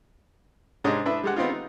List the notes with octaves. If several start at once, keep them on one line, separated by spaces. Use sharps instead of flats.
G#2 C3 C#4 D4 D#5 D#6
D4 E4 B4 E5
G3 G#3 F#5
B3 C4 D#4 F4
D#4